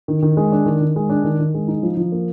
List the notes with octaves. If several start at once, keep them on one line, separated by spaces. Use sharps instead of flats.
D#3
D#3
G#3
D4
D#3
D#3
G#3
D4
D#3
D#3
G#3
D#4
F3
F3
A#3